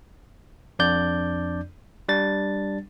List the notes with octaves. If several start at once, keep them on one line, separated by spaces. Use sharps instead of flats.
F2 D4 D5 G6
G3 D4 A6